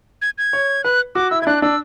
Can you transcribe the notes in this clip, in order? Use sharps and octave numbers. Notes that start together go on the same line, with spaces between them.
G#6
G#6
C#5
B4 F#6
F#4 D6
E4 E6
E4 G#6
D4 F#6
D4 E6